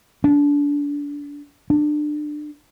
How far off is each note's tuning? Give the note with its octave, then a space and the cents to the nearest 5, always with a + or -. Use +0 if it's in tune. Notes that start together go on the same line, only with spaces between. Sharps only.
D4 -25
D4 +25